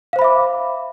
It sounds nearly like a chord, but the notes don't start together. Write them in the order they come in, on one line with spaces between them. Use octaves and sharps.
F5 C5 B5 E5 D6